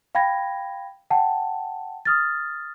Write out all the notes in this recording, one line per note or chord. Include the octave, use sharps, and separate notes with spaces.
F5 G5 B5 G#6 A#6
F#5 G5 A5
D#6 F6 A6